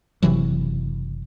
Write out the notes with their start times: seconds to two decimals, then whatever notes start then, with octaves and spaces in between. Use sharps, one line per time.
0.22 F#1 C3 E3 F#3